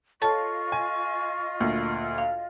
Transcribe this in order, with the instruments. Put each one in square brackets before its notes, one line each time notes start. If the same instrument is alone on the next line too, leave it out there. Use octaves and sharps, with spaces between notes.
[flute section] F4 D#5 [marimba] A4 A5 A6 [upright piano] C#5 [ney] C#6
[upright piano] G#5
D2 A#2
[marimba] F5